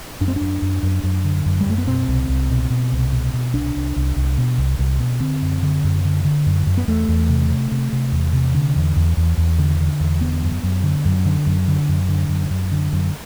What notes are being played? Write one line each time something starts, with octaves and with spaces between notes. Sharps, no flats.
F#2 D4
C4
F#2 D4
F#2
F#2
F#2
D3
F#2
G3
F#2 A3
B3
B2 C4
C2
C2
B2
B2
C2
B2
B2
C2 D4
C2
C2
C2
B2
C2
C2
B2
D3 C4
F#2
D3
F#2
D3
D3
F#2
F#2
B3
E2 A3
E2
C3
C3
C3
C3
E2
C3
D3
E2
E2
E2
E2
D3
D3
E2
D3 B3
F#2
F#2
D3
F#2
D3
F#2
D3
F#2
D3
F#2
F#2
D3
F#2